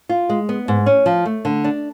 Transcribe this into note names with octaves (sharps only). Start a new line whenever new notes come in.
F4
G#3
B3
G#2
C#4
F3
A3
D3
D4